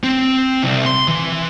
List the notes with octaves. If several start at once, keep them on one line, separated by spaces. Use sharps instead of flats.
C4
C2
C6
E3